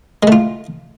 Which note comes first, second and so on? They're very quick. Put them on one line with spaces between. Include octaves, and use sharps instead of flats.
G#3 A3 F4